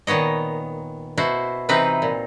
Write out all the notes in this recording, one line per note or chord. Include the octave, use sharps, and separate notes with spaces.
A#2 D#3 B3 C#5 D#5
B2 E4 F#4 C5
C3 E3 C4 D#4 B4
A#2